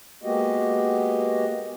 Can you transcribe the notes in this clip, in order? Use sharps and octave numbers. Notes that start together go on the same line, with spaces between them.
G#3 A#3 B3 F#4 G4 D#5